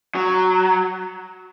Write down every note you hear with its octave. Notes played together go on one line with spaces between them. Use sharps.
F#3